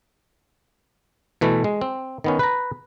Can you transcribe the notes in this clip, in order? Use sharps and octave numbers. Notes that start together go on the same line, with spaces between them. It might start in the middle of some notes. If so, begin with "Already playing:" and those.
B2 E3 A3
G#3
C4
D#3 B3 C#4
B4 A#5